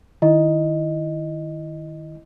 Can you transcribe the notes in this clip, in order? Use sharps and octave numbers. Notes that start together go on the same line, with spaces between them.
D#3 E4 D#5